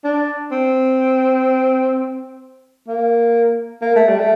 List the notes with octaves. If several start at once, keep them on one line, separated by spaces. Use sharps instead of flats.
D4
C4
A#3
A#3
A3
G3
A3